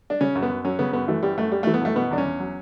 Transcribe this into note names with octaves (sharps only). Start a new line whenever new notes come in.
D4
C#3 C#4
F#2
B3
F#2
F#3 C#4
C#3 B3
F#2 B3
E3 A3
F#2 G3
F#2 A3
G3
A3
E3
B3
F#2 A3
B2 B3
E2 D4
C#4
E2
F#3